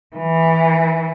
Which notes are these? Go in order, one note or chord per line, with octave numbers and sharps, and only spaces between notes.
E3